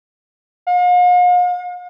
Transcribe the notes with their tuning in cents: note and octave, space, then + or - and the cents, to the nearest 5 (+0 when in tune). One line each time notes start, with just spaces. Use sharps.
F5 +45